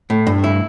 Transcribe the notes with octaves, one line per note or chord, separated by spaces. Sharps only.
A2
G2
E4